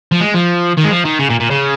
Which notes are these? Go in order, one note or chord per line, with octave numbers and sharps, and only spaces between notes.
F3
G#3
F3
D#3
G#3
F3
D#3
C#3
A#2
A#2
C#3